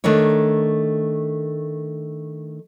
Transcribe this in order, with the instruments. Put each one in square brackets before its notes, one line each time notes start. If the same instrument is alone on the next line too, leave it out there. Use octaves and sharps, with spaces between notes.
[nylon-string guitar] D#3 A3 D4 A#4 C#5